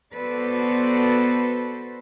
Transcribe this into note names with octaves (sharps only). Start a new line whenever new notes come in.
B3 F#4 A4 B4 C5 D5